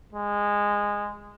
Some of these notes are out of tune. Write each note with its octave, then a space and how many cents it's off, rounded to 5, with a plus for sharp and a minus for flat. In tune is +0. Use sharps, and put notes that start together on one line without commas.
G#3 -15